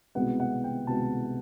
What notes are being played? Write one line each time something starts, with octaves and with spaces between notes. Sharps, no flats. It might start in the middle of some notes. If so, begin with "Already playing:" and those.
C2 B2 G#3 B3 F#5
F#5
G5
C2 B2 G#3 B3 A5